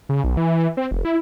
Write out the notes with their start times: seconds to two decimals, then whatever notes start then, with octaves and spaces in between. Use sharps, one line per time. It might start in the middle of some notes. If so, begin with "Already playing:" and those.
0.09 C#3
0.24 B1
0.37 E3
0.77 C4
0.91 F1
1.05 E4